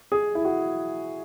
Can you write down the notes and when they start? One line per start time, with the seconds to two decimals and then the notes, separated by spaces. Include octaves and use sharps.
0.12 G#4
0.35 E4
0.45 F#4